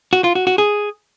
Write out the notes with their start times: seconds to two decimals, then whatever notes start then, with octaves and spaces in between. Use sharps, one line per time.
0.13 F#4
0.24 F4
0.35 F#4
0.47 F#4
0.58 G#4